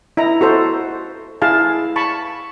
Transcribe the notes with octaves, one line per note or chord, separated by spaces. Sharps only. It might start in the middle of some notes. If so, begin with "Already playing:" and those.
E4 D#5 A#5
F#4 A4 C5
E4 G#4 F5 A5
A5 B5 C#6